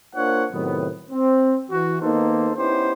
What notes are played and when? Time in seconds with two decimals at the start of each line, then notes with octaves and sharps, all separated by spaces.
0.15 A#3 D4 F4 C5 C#5 F#5
0.52 A2 C3 D#3 F#3 B3
1.10 C4
1.71 E3 F#4
2.02 D#3 A#3 B3 D#4 A4 C5
2.56 B3 C#4 D#4 E4 G4 C5